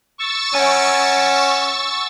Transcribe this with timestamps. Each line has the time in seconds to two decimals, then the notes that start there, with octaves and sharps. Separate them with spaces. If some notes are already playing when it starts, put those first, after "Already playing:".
0.18 C#6 E6 A6
0.55 C#4 F#5 G#5